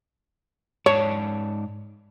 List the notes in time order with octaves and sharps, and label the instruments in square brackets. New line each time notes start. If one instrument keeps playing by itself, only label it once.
[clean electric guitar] G#2 D5 A5 [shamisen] C#5